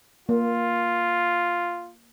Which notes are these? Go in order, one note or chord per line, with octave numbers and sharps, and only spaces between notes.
A#3 F4